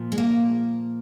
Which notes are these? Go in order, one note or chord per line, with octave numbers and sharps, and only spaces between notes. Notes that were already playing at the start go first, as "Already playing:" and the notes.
Already playing: A#2 F3
G#3
A#3